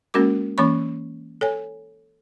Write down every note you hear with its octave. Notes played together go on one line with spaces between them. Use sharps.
G#3 A#3 C#4 F#4 A#4 D6
E3 A#3 C#4 C#5 B5 C#6
A4 C#5 G#5